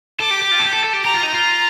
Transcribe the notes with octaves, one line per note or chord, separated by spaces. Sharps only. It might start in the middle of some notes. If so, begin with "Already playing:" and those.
A4 D6
G4
G4
F4
A4
G4
A4
A4
G4
G4 A#5
F4
D#4
F4